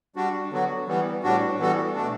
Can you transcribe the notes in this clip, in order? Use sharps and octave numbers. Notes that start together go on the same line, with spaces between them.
G3 D4 F#4
D3 F#3 B3 F#4
E3 G3 B3
A2 G3 D4 F#4
E3 G3 B3 F#4 A4
B2 A3 D4